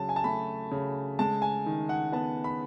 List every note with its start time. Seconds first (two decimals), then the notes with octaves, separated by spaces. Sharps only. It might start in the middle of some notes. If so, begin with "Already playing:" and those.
Already playing: C#3 F#3 A5
0.09 G#5
0.16 A5
0.24 A3 B5
0.72 C#3
1.19 G#3 A5
1.42 G#5
1.66 D#3
1.89 F#5
2.12 B3 A5
2.44 B5